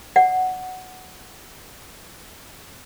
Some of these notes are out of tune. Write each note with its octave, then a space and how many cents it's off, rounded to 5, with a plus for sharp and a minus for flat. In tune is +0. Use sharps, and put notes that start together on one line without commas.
D5 +0 F#5 +0